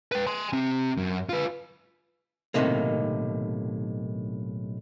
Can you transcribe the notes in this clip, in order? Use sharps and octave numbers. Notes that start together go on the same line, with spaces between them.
B4 G5
G#5 C6
C4 G4
F#2
F4 B4
B1 A2 C3 D#3 A#3